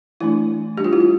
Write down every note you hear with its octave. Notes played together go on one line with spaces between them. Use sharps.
E3 A3 D4 E4
G3 D4 G4
F4
E4
F4